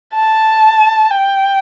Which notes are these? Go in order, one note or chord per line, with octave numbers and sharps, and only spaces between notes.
A5
G5